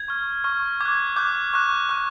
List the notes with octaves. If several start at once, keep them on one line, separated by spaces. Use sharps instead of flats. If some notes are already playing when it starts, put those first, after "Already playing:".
Already playing: G#6
C#6 F6
C#6 F6
D6 F#6 G#6
D6 F#6 G6
C#6 F#6
C#6 F#6